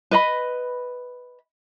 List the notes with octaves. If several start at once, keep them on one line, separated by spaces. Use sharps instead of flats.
B4 D#5 B5